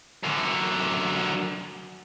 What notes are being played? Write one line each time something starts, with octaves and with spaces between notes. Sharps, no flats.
F#2 D3